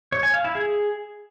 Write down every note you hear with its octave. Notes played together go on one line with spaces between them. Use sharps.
C#5
G#5
F5
E4
G#4